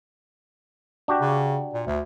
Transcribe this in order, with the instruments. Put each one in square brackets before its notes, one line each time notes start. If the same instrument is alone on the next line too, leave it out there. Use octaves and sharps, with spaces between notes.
[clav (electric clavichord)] D4 F#4 G4
[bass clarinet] C#3
A#2
D2